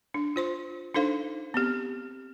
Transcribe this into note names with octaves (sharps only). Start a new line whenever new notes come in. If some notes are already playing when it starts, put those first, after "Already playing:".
D4
F4 C5 C6
D4 D#4 A4 C5 F5
B3 C4 G4